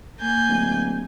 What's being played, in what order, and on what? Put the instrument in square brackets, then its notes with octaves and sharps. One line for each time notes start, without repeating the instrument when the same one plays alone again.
[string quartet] A#3 G#5 G6
[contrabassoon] D1